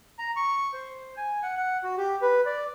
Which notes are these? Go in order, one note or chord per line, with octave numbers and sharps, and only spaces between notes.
A#5
C#6
C5
G#5
F#5
F#5
F#4
G4
B4
D5